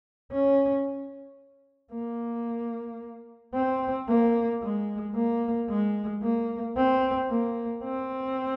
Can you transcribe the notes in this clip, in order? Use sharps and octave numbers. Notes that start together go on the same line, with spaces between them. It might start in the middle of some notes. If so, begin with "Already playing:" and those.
C#4
A#3
C4
A#3
G#3
A#3
G#3
A#3
C4
A#3
C4